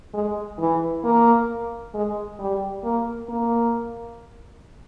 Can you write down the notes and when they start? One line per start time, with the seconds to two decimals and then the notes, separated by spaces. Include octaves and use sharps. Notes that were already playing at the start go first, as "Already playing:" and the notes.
0.14 G#3
0.59 E3
1.04 A#3
1.94 G#3
2.39 G3
2.84 A#3
3.29 A#3